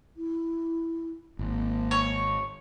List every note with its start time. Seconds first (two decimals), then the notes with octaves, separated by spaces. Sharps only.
0.17 E4
1.39 G#1 A#3
1.91 C#5